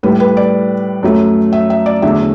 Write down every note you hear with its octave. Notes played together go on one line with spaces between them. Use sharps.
A2 G3 B4
B4
D5
F#2 F#3 A3
E5
E5
D5
E2 D3 F#3 A3 E5